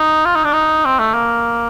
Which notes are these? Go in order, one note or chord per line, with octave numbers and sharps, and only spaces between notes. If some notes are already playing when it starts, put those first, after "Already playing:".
Already playing: D#4
F4
D#4
D4
D#4
C4
A3
A#3